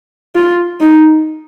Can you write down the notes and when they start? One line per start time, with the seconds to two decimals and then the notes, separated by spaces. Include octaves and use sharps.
0.35 F4
0.80 D#4